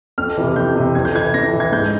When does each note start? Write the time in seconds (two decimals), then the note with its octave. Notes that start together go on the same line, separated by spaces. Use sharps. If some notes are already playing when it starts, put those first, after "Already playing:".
0.18 F2 F6
0.37 C3 E3
0.56 F2 G6
0.76 C3 E3
0.95 F2 G#6
1.05 G6
1.15 E3 G#6
1.34 F2 A#6
1.53 E3
1.60 G#6
1.72 G#2 G6